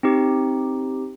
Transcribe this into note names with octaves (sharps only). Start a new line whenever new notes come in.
C4 D#4 G4